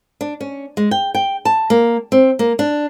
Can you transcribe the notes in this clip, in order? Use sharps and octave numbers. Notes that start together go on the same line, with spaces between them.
D4
C#4
G#3
G5
G5
A5
A#3
C4
A#3
D4